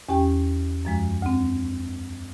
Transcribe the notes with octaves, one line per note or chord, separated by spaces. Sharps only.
E2 C#4 G4 G5
F#2 F3 G#3
D2 C4